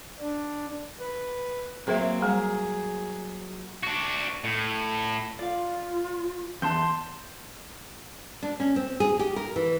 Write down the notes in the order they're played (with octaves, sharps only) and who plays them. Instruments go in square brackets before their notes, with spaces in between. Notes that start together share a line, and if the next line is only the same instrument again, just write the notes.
[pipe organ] D4
[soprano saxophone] B4
[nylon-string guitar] F#3 A#3 [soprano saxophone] C4 [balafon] G#4 A#4 E5
[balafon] G3 A#5 [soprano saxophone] G#4
[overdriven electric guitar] D4 F#4
A2
[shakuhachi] F4 [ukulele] D5 F5
[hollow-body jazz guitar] E2 [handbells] A5 C6 G6
[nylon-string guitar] D4
C#4
C4
G#4
G4
A#4
E3